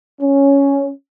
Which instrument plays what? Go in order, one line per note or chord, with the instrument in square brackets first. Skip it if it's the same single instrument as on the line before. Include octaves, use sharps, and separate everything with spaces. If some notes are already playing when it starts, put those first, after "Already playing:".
[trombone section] C#4